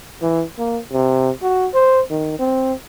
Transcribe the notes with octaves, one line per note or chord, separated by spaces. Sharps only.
E3
A#3
C3
F#4
C5
D#3
C4